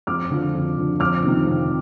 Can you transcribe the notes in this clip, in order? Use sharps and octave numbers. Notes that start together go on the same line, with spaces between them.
F2 D6 F6
D3 F3
F2
D3 F3
F2 D6 F6
C3 D#3
F2